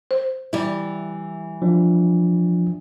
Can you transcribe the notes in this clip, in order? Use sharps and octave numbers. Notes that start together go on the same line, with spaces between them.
C5
E3 G3 E4
F3 D4